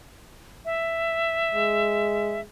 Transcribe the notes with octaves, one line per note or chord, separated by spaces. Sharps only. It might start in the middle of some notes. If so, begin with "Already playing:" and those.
E5
G#3